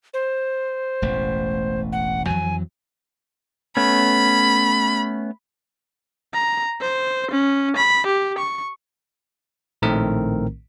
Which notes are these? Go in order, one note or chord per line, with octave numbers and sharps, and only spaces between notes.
C5
E1 A1 A3
F#5
F2 E3 F#3 G#5
A3 B3 C#4 B5
A#5
C5
C#4
B5
G4
C#6
A#1 A2 D#3 A3 C4 A#4